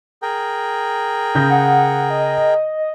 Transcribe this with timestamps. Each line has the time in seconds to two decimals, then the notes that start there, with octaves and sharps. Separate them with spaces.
0.22 G#4 A#4 G5
1.35 C#3 G6 A#6
1.50 F#5
2.10 D#5